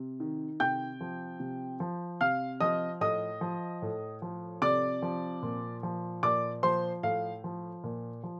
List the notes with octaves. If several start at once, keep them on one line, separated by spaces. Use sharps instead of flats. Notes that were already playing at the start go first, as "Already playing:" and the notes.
Already playing: C3
D#3
C3 G5 G6
F3
C3
F3
C3 F5 F6
F3 D#5 D#6
A2 D#5 D#6
F3
A2
F3
C3 D5 D6
F3
A#2
F3
A#2 D5 D6
F3 C5 C6
A2 F5
F3
A#2
F3